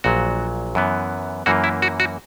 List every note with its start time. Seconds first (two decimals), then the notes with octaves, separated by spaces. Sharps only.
0.04 A#1 A#2 F#3 F#4
0.75 F#2 E3 B3
1.46 F#2 E3 A#3 F#4
1.64 E4
1.82 F#4
2.00 F#4